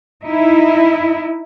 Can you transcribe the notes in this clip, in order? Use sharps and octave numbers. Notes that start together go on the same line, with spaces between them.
D#4 E4